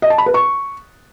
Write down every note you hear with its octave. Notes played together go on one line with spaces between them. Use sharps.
D#5
A5
B5
B4
C#6